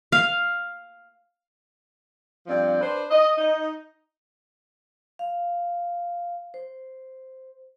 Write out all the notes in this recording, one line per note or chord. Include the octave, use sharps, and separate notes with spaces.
F5
G2 F3 C4 D5
D4 B4 C5
D#5
D#4 D#5
F5
C5